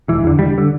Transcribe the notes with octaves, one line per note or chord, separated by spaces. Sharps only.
E1 E3
E2 D3
E1 G3
D3